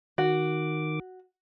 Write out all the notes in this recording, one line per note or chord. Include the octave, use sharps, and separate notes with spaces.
D#3 F#4 D6